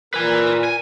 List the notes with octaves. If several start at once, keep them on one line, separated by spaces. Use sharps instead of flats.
A#2 A#4 B4 G#5
G#5